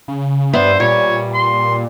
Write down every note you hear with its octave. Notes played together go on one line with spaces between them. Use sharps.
C#3
G2 B3 C5 D5 E5
A#2 G3 C#5
C6